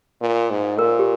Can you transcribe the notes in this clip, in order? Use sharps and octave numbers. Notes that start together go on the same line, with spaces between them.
A#2
G#2
A#2 A#4
G4